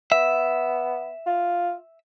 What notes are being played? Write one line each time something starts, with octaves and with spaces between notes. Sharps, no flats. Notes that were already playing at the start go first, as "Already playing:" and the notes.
B3 E5
F4